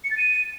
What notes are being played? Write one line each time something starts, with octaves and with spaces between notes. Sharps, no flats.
C#7
A6
D#7